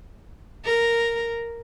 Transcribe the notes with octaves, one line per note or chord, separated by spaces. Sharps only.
A#4